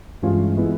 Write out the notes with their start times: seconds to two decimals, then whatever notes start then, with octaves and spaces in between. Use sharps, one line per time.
0.22 G2 E3 G#3 C#4 F4
0.57 E3 G#3 B3 E4